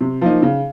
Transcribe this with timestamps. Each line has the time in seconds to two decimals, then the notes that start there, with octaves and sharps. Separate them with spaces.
0.01 C3
0.21 F3 A#3 D#4
0.42 C#3